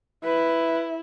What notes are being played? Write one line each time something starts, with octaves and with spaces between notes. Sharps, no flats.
E4 B4